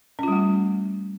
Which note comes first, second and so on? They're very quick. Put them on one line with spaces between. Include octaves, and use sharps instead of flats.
C#4 F4 G3 A3